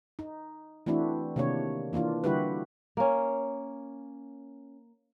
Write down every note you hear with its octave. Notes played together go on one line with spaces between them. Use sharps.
D#4
E3 A3 C4 D4 E4 F#4
C3 D#3 A#3 D4 C#5
E3 A#3 D4 F4
D3 G3 E4 F#4 G4 B4
A#3 C#4